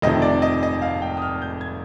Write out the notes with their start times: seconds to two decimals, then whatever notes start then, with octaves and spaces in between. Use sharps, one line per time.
0.02 F1 F2 C3 D#3 D#5
0.22 D5
0.42 D#5
0.63 D#5
0.82 F5
1.02 G5
1.17 D#6
1.22 F6
1.42 G6
1.61 G#6